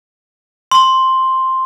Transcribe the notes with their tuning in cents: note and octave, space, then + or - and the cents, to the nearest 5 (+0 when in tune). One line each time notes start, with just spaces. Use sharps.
C6 +5